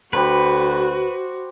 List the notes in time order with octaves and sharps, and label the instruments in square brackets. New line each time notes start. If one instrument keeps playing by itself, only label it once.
[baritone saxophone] D2 [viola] F#4 [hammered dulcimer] G4 C5 B5 [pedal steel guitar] B4